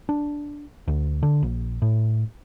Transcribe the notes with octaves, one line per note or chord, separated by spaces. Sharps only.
D4
D2
D3
A#1
A2